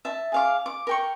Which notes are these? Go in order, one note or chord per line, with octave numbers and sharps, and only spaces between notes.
E5 A5
G#4 F5 D6
D6
A#4 G5 C#6